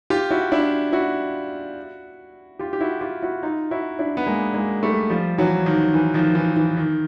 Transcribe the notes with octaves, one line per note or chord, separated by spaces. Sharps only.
F4 G4
E4 F#4
D4 E4
E4 F#4
F4 G4
G4
E4 F#4
F4 G4
E4 F#4
D#4 F4
E4 F#4
D4 E4
B3
G#3 A#3
G#3 A#3
G3 A3
F3 G3
E3 F#3
D#3 F3
E3
D#3 F3
E3
E3
D#3